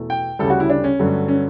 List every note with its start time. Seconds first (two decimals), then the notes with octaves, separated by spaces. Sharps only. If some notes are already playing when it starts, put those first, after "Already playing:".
Already playing: E2 B2 A3
0.10 G5
0.39 D2 C#3 G3 A4
0.50 F#4
0.60 E4
0.70 D4
0.84 C#4
0.99 G2 D3 F#3 A3
1.28 C#4